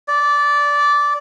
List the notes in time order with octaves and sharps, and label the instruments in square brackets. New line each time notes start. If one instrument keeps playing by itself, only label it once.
[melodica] D5